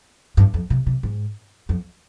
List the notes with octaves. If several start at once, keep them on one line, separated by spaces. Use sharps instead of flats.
G2
F2
C3
C3
G#2
F2